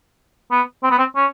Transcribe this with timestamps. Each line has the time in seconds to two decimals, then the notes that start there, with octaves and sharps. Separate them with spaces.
0.51 B3
0.83 C4
0.91 B3
0.99 C4
1.16 C#4